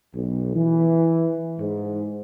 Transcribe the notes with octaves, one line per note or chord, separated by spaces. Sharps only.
B1
E3
G#2